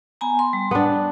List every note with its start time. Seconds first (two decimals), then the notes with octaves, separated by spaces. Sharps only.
0.21 B3 G#5 A#5
0.39 C6
0.53 G3
0.71 B3 D4